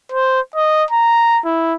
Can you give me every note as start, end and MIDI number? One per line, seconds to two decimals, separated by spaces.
0.12 0.40 72
0.56 0.84 75
0.91 1.40 82
1.45 1.74 64